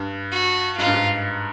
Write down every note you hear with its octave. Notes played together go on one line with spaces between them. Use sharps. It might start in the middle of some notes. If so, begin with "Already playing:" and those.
Already playing: G2
F#4
G#2 F4
G2
G#2